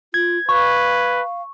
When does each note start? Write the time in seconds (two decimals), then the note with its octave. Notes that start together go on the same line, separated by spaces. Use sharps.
0.14 F4 G#6
0.49 B4 F5 C#6